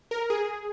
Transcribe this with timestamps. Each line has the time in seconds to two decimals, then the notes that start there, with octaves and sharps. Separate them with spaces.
0.11 A#4
0.30 G#4